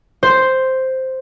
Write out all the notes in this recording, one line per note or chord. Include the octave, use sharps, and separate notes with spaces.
C5